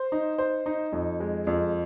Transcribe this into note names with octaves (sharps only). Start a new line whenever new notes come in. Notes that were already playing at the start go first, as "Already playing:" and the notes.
Already playing: C5
D#4
C5
D#4
F2
G#3
F2